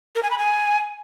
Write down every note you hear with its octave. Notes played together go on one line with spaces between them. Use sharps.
A#4
G#5
B5
G#5